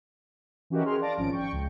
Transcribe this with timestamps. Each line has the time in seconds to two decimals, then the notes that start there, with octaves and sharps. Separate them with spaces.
0.70 E3 C#4 F#4 G4 A#4 D#5
0.84 G#4 A#4 G#5 C6 F6
1.01 D5 F5 A5 A6 A#6 D7
1.17 G#1 F3 C#4 D7
1.32 G5 C#6
1.52 C#2